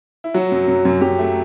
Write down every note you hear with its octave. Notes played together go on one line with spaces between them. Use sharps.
E4
F#3 F#4
F#2
F#2
F#2
F#2 G4
A3